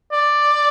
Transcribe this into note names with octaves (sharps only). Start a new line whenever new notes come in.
D5